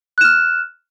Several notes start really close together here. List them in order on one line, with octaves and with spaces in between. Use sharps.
F#6 E7 F6